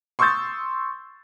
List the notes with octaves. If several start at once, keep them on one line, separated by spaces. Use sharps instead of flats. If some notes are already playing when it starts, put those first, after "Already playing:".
C6 C#6 D#6 E6 G6 A6